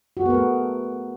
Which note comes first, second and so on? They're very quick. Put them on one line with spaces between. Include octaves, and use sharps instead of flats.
F#4 G#4 B3 A#4 A3